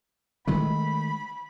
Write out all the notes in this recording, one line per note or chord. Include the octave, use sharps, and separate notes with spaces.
D#3 G#3 A3 B5